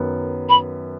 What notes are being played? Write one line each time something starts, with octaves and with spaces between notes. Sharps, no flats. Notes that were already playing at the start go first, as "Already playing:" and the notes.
Already playing: F#2 D#3 F#3 B3
B5